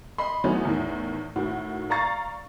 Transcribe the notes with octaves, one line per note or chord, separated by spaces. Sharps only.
D#5 B5 C6
D#3 E3 F#3 A3 B3 C#4
E2 A2 D#3
A2 D#3 F#4
D5 F5 A#5 C#6 A6 C7